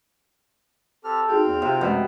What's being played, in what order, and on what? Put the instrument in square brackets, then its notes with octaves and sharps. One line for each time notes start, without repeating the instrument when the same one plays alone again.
[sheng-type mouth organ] C4 G4 F6 [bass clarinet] A4
[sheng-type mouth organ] C4 F5 G5 [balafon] D#4 F#4 G#4
[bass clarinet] E2
[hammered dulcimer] C3 [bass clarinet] F4
[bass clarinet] F#2 [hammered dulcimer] B2 [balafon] F3 G#3 A3